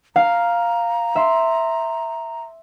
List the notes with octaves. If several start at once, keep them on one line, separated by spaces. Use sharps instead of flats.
F5 A#5
E5 C6